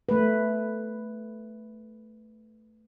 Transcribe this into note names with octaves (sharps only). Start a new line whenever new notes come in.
A3 B4